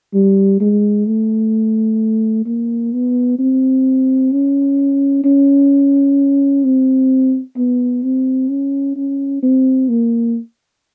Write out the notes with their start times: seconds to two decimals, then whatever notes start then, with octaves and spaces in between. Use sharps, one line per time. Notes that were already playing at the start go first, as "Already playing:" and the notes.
0.14 G3
0.60 G#3
1.07 A3
2.46 A#3
2.93 B3
3.39 C4
4.32 C#4
5.24 C#4
6.64 C4
7.57 B3
8.03 C4
8.50 C#4
8.96 C#4
9.43 C4
9.89 A#3